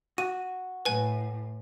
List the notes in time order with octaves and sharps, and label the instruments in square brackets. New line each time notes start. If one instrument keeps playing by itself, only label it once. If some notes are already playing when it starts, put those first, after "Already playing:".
[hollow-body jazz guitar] F#4 [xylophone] D#7
[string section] A2 [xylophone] B4 G#5